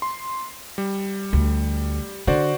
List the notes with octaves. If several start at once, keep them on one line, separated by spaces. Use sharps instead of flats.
C6
G3
D2
D3 F#4 C5 D5